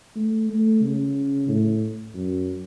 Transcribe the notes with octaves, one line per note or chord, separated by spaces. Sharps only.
A3
A3
C#3
A2
F#2